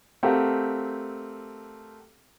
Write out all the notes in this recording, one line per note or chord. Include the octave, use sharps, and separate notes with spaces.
A3 C4 F#4 G4 A#4 F5